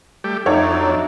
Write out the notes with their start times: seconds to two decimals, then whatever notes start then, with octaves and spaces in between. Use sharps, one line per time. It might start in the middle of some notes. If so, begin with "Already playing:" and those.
0.24 G3 A3 G4
0.46 F2 A3 D4 D#4 C#5 F#5
0.72 F#3